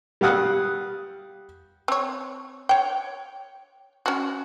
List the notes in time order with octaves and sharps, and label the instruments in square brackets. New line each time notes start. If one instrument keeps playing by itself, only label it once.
[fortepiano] G3 G4 F5 F#5 D#6 F#6
[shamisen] C4 C#5
C#5 G5
C#4 F#4